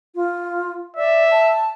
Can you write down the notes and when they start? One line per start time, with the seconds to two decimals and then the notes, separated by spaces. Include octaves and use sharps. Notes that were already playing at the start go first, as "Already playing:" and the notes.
0.15 F4
0.97 D5 E5
1.31 A5